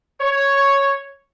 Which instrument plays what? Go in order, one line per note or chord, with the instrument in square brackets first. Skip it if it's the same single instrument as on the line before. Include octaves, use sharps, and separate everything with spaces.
[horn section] C#5